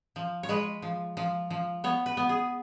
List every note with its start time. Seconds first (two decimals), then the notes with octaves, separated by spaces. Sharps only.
0.16 F3
0.43 C#5
0.49 G#3 B4
0.82 F3
1.17 F3
1.50 F3
1.84 B3 C#5
2.06 B4
2.17 B3
2.29 G#4